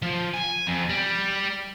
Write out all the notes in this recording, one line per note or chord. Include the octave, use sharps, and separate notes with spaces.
F3
G#5
F2
G3